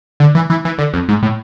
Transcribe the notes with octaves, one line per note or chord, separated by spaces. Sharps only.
D3
E3
E3
E3
D3
F2
G#2
A2